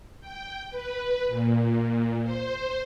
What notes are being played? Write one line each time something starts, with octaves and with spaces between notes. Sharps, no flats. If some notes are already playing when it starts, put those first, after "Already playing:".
G5
B4
A#2
C5